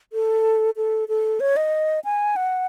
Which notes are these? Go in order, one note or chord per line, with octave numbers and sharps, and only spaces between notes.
A4
A4
A4
C#5
D#5
G#5
F#5